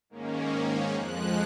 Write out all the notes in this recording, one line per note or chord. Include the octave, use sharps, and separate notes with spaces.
G#2 D#3 A#3 C#4
F2 F3 G#3 F#6